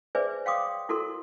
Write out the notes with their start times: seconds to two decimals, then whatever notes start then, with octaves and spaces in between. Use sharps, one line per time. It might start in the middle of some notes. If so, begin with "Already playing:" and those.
0.15 G#4 B4 C5 D5 E5 G#5
0.45 C#5 F5 G5 C6 D6 D#6
0.89 E4 F#4 A4 A#4 C6